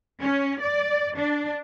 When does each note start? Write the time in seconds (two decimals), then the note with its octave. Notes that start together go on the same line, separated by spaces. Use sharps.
0.21 C#4
0.61 D5
1.17 D4